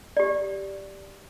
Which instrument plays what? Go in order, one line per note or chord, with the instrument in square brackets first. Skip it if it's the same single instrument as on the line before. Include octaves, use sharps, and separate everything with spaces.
[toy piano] G4 D5